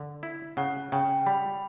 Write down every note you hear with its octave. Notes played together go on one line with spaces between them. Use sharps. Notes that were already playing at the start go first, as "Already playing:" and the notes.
Already playing: D3
E4
C#3 F#5
C#3 G5
G3 B5